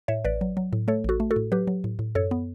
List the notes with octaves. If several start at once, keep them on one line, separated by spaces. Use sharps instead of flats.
A2 C#5 E5
A1 B4 D5
F#3
F#3
A2
A3 A4 C#5
A1 F#4 A4
A3
F#4 A4
A2
F#3 G4 B4
F#3
A2
A2
F#2 A4 C#5
B3